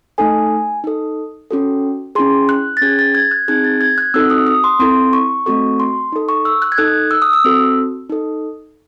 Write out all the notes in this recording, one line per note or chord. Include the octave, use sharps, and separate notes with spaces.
A3 D#4 A4 G#5
D#4 A4
C#4 F#4 A4
C#4 E4 G#4 C6
F#6
A6
C#4 G#4 G#6
A6
G#6
F#6
C4 D#4 G#4 G#6
A6
G#6
F#6
C4 D#4 F#4 A4 E6
D#6
D#6
C6
C4 E4 A4 C6
C#6
A3 C4 F#4 A4 C#6
C6
D#4 A4
C#6
E6
F#6
G#6
D#4 A4 F#6
E6
D#6
E6
C4 F#4 A4
D#4 A4